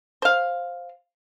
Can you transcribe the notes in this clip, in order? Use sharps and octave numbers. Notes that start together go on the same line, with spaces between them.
C5 F5